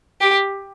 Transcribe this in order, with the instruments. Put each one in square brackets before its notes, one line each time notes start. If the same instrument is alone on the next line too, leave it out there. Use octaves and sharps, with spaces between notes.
[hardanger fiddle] G4